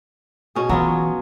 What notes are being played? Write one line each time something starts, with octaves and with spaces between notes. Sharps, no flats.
B2 C#4 G#4
E3 F#3 B3 F4